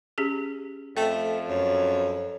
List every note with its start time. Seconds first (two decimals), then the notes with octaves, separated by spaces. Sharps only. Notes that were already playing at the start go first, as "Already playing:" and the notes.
0.18 C#4 G4 G#4
0.97 F2 A3 E5 G5
1.49 F#2 C#5